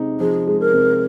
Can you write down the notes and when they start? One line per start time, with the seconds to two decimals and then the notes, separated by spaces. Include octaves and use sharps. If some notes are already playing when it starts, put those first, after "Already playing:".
Already playing: C3 G#3 D#4
0.20 F3 G#4
0.47 G#3
0.60 A#4
0.73 C3